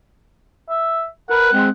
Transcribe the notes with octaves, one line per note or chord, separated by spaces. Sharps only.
E5
A#4 B4 F#5
G#3 C4